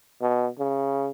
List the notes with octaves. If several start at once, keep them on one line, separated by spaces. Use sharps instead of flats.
B2
C#3